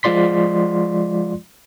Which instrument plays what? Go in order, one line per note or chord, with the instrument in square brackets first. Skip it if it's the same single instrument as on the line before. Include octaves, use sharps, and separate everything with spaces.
[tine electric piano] F3 G#3 F4 D5 C6 B6